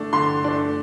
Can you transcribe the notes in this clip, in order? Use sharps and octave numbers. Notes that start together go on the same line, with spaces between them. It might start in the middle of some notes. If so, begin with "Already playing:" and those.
Already playing: D3 A3 D4
D3 C6
A3 D4